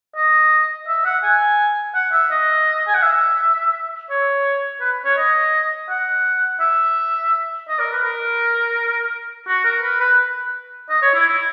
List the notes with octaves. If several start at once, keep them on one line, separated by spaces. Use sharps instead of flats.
D#5
E5
F#5
G#5
F#5
E5
D#5
G#5
F#5
E5
C#5
B4
C#5
D#5
F#5
E5
D#5
A#4
B4
A#4
F#4
A#4
B4
B4
D#5
C#5
E4
E4